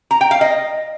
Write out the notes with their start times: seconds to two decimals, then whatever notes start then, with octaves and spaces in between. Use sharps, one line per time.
0.11 A#5
0.21 G5
0.31 F5
0.41 D#5